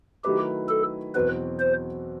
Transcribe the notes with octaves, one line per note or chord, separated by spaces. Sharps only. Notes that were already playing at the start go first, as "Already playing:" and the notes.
D#3 F#3 A3 E4 G4 B4
A4
E2 B2 F#3 C4 F#4 B4
C5